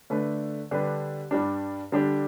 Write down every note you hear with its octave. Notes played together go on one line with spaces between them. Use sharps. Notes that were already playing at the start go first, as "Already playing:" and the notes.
D3 A3 D4 B4
D3 G3 D4 G4 B4
G2 G3 D4
D3 G3 D4 G4